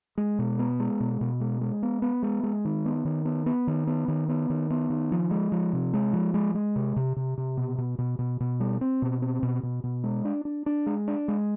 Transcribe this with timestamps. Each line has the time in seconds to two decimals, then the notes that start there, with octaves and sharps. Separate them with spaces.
0.18 G#3
0.39 B2
0.59 B3
0.80 G#3
1.00 B2
1.21 B2
1.40 G#3
1.61 G#3
1.83 B3
2.02 B3
2.23 G#3
2.43 G#3
2.65 D#3
2.85 B3
3.05 D#3
3.25 B3
3.46 B3
3.67 D#3
3.87 B3
4.08 D#3
4.29 B3
4.50 D#3
4.70 B3
4.90 D#3
5.11 F3
5.31 G#3
5.52 F3
5.73 C3
5.94 G#3
6.13 F3
6.34 G#3
6.55 G#3
6.76 C3
6.96 C3
7.16 C3
7.38 C3
7.57 B2
7.78 B2
7.98 B2
8.19 B2
8.40 B2
8.60 G3
8.81 C4
9.02 B2
9.22 C4
9.43 B2
9.63 B2
9.84 B2
10.04 G#3
10.25 D4
10.45 D4
10.66 D4
10.86 G#3
11.08 D4
11.28 G#3